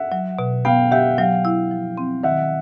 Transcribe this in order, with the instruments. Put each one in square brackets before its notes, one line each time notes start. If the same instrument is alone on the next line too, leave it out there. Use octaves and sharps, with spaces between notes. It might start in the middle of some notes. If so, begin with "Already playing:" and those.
Already playing: [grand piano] E5 F#5
[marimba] F#3
B2
[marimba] B3 [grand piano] F5 G5
[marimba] G4 [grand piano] E5 F#5
[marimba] F#3 [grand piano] F5 G5
[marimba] E4
F3
C4
[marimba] D#3 [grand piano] E5 F#5